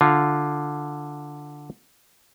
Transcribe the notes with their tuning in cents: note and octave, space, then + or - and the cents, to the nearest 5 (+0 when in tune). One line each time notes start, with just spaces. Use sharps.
D3 +0 F4 +0